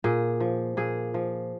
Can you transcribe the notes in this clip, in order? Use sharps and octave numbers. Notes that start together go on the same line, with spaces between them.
A#2 G#4
F3
A#2 G#4
F3